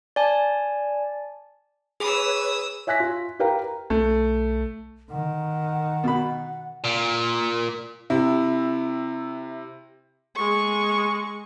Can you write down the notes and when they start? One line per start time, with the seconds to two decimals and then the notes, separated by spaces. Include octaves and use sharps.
0.16 D5 G#5 A5
2.00 G#4 B4 C#5 B5 D#6 E6
2.87 C#5 E5 G#5 F#6 A#6 B6
3.00 F4
3.39 G4 A#4 B4 F5 G5 A#5
3.90 B1 A3
5.11 D#3 F#5
6.04 B2 B5
6.85 A#2
8.10 C3 E4
10.35 G#3 C#6